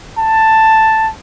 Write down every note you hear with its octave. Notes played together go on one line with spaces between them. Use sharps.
A5